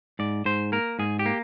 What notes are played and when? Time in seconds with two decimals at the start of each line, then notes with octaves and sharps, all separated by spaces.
0.19 G#2 D5
0.45 G#2 C5
0.72 A#3 A#4
0.99 G#2 G#4
1.19 G4
1.26 A#3